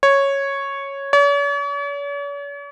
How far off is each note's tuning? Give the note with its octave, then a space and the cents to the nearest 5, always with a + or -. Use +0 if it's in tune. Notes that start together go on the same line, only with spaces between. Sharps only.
C#5 -5
C#5 +45